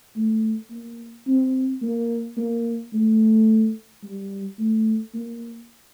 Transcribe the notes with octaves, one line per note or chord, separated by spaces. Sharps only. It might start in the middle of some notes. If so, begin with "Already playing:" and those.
A3
A#3
C4
A#3
A#3
A3
G3
A3
A#3